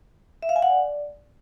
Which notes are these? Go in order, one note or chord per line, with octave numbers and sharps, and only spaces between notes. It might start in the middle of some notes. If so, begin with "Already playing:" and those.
E5
F5
G#5
F#5
D5